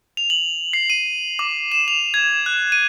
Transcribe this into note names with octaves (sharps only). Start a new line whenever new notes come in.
F7
F#7
C7
D#7
D6
E7
F7
G#6
F#6
D#7